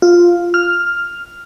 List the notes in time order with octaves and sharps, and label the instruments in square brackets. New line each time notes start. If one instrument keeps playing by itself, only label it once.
[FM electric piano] F4
F6